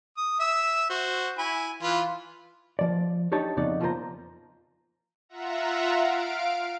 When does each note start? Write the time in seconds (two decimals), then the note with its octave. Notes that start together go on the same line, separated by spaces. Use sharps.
0.17 D#6
0.40 E5 E6
0.90 F#4 C5
1.38 E4 G#5 B5
1.83 E3 F4 B4
2.79 F3 D5
3.32 D4 D#4 G4 C#5 D5 A5
3.57 F2 C#3 B3 D#4 D5
3.81 F3 C#4 F4 A#4 C5 A#5
5.29 F4 E5 F#5 A#5
5.92 F5 D7